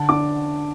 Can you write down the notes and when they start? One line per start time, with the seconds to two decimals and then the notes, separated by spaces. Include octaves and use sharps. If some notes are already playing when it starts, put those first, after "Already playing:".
Already playing: D3 A5
0.09 D4 D6